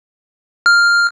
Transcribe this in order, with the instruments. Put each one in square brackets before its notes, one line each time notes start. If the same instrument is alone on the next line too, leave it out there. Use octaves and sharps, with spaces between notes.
[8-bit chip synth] F6